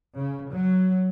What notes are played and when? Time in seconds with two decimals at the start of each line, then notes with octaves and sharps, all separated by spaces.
0.17 C#3
0.52 F#3